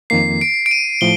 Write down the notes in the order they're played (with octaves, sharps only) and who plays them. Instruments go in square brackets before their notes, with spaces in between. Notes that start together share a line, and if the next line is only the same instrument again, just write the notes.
[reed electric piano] F2 D#3 A#3 [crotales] C7
[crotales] D7
D7
D#7
[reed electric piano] A2 F3 [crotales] G7